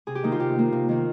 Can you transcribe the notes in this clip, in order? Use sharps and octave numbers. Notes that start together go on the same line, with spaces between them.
C3 G#4
G4
D#3 A#3 D#4
F4
C3 G4
D#3 A#3
C3
D#3 A#3